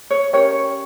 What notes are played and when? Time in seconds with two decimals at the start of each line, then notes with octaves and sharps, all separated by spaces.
0.10 C#5
0.33 C#4 G4 A#4 C#5